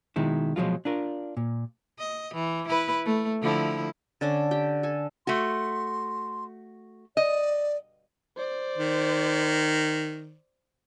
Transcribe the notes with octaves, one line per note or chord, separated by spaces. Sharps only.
B2 D#3 G#3 E4
B2 F3 F#3 G#3 F4
D4 F4 A#4
A#2
D#5
E3
E4 B4
A3
D3 F3 E4
D3 C#4 D4
G4 G5
A4 G#5
A3 F#4 C6
D5 D#5
C5 D5
D#3